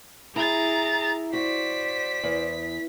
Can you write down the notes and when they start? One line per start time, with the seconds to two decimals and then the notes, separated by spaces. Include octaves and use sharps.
0.36 E4 G#4 A#5 A6
1.33 F#4 C5 D5 B6
2.23 E2